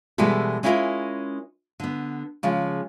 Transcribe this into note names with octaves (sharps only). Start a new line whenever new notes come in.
B2 E3 G3 G#3 B3 A4
G#3 C#4 E4 F4 G4 A#4
D3 B3
C#3 F3 G#3